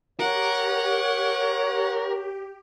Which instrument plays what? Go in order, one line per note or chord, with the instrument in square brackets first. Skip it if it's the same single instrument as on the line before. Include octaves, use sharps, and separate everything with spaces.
[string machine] G4 [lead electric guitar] A#4 [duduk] C#5 [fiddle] F#5